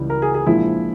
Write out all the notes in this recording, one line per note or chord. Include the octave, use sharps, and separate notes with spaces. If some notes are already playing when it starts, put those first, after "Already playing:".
Already playing: C#2 C#3 E3 G3
A#4
G#4
G#4
A#1 A#2 F3 G#3 E4